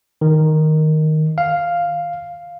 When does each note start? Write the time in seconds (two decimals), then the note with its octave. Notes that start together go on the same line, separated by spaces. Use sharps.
0.21 D#3
1.38 F5